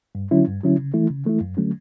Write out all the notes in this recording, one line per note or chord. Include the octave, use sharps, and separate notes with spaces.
G2
D3 F#3 C#4 E4
G2
D3 F#3 C#4 E4
C#3
E3 A3 E4
C#3
E3 A3 E4
F#2
D3 F#3 A3 C#4